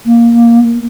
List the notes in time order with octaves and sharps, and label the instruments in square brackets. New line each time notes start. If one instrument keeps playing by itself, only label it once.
[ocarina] A#3